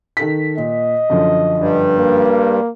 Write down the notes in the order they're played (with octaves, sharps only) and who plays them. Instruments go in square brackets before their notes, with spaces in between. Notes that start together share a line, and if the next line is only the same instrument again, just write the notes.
[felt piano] D#3 A4 B6
[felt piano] A#2 [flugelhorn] D#5
[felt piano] F#2 D3 F3
[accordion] G2
[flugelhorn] A#3